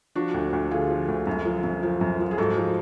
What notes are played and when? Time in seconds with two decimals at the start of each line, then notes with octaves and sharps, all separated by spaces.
0.16 F3 D4 F#4
0.34 D2
0.53 D2
0.71 D3 F4 G#4
0.90 F3
1.08 D2
1.27 F#2
1.45 F3
1.64 F#2
1.83 F3
2.01 F#2
2.20 F3
2.31 G#4
2.38 G#2 F#4 A4
2.57 F3